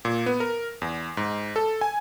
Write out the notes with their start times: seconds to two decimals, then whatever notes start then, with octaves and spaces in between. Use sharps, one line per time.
0.05 A#2
0.26 B3
0.40 A#4
0.82 E2
1.17 G#2
1.56 A4
1.81 G#5